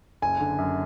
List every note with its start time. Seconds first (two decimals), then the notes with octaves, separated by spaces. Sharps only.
0.22 F#1 G#5
0.40 D3
0.58 F#2